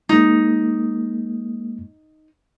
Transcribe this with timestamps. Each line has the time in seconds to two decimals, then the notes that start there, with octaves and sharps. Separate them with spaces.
0.09 G#3 A#3 D#4